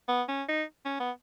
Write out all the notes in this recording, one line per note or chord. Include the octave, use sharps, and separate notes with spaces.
B3
C#4
D#4
C#4
B3